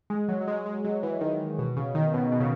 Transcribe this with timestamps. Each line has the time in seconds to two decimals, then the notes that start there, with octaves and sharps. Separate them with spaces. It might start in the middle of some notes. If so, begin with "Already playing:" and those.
0.10 G#3
0.28 F#3
0.41 F#3
0.48 G#3
0.66 G#3
0.84 F#3
1.03 E3
1.21 D#3
1.59 B2
1.77 C#3
1.95 D#3
2.14 B2
2.32 B2
2.40 C#3